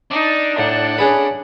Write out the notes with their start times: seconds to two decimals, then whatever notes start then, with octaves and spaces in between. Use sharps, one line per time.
0.11 D4 D#4
0.59 A2 F#5
0.98 C#4 G#4 B4